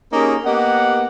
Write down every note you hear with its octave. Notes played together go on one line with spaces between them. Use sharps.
A#3 C#4 D#4 G4 G#4 A#4
A#3 B3 G4 D#5 F#5